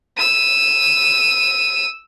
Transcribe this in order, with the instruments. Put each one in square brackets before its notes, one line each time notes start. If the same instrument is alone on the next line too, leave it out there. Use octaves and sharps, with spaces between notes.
[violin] E6 D#7